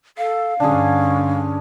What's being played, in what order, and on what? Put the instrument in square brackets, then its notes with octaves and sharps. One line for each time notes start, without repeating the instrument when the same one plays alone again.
[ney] A4 [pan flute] F5
[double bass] G2 D3 [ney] C#4 [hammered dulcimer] D4 G#4